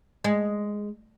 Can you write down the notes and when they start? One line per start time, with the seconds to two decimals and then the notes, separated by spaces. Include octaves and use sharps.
0.24 G#3